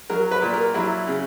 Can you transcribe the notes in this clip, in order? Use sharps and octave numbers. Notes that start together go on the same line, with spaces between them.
F#3 A#4
B4
A#2
A#4
F#3 E4
C#3